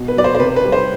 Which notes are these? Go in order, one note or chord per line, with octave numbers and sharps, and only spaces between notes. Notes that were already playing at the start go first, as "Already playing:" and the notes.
Already playing: B2
B4
F#3 D5
C5
C5
C3 B4
B4
G3
C5